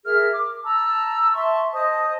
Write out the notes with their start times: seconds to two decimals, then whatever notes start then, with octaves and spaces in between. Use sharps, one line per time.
0.05 G#4 A#4 E5 F6
0.32 D6
0.64 A5 A#5 E6
1.33 E5 A5 C6 C#6
1.72 C5 D#5 A5 D#6